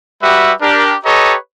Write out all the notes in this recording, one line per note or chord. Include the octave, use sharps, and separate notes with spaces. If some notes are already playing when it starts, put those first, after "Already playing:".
G3 F#4 G4 B4 E5
D4 G4 A#4
G4 A4 B4 C#5 D#5 A#5